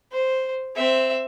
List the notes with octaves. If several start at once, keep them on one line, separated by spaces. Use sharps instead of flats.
C5
C4 E5